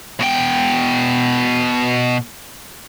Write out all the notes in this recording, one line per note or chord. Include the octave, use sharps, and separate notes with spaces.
B2 G5